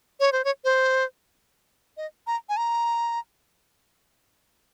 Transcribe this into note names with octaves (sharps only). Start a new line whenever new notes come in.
C#5
C5
C#5
C5
D#5
A#5
G#5
A#5